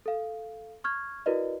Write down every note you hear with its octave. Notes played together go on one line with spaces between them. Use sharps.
A4 F5
C#6 F6 G#6
E4 F#4 A#4 B4 D5 D#5